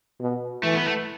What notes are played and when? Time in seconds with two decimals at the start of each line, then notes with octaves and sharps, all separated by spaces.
0.20 B2
0.63 E3 A3
0.75 B3
0.86 A3